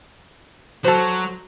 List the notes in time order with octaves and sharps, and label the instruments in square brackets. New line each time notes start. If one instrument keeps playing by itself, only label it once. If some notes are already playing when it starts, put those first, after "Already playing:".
[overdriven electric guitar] F#3 [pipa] A4 C5